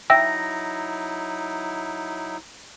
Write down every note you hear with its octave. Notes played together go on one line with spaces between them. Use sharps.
F#3 D#4 E4 E5 G5 E6 A#6